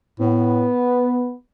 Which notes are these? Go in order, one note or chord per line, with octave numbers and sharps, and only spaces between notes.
A2 B3